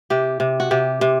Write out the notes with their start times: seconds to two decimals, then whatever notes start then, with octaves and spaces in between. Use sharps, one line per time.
0.10 C3 G4
0.40 C3
0.60 F#4
0.71 C3 G4
1.01 C3